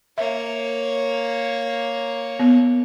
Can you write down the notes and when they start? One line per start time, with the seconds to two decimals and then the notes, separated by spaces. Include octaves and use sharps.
0.18 A#3 C#5 E5
2.39 B3